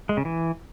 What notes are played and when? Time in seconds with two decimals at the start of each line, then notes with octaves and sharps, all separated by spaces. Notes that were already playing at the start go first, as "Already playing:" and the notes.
0.09 G#3
0.17 C#3
0.25 E3